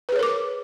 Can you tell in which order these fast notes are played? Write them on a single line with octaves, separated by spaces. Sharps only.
B4 G#4 C#5 A#4 D6